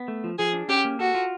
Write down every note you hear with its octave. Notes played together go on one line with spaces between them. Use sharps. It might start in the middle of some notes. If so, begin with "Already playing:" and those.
Already playing: B3
A3
F3
F3 G#4
D4
C#4 G4
A#3
F#4 A4
F4